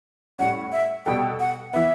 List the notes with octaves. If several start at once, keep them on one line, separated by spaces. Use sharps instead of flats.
A2 G3 C#4 F#5
E5
B2 G3 B3 F#4 A4 G5
F#5
E3 B3 E5